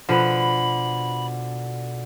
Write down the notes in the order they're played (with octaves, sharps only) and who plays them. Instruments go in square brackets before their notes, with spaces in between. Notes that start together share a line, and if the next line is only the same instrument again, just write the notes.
[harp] B2 [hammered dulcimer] D3 [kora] F3 B4 [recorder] B5